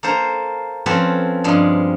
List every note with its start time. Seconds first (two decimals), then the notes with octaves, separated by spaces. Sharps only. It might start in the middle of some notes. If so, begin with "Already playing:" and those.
0.03 A#3 A4 C5 A#5
0.86 F3 C4 C#4 A4 B4
1.44 G2 F3 G#3